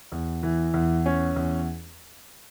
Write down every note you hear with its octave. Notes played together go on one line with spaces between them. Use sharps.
E2
E3
E2
C#4
E2